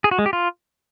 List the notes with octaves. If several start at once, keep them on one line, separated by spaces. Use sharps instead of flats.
G#4
F#4
G#3
G4
F4